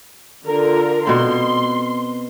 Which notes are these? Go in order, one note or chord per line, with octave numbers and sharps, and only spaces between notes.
D3 F4 A#4
B2 C4 C6